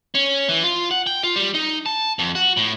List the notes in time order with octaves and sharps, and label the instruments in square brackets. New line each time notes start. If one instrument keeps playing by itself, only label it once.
[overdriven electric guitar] C#4
E3
F4
F#5
G5
F4
G3
D#4
A5
F2
F#4
A2